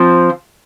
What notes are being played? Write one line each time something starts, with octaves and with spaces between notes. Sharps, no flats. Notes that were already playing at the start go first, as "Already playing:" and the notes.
Already playing: F3 C4